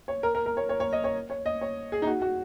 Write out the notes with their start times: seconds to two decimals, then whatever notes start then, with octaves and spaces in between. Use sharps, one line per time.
0.08 C#5
0.23 A#4
0.35 A#4
0.46 A#4
0.57 C#5
0.69 C#5
0.80 C#5
0.93 D#5
1.04 C#5
1.30 C#5
1.46 D#5
1.61 C#5
1.92 G#4
2.02 D#4
2.07 F#4
2.22 F#4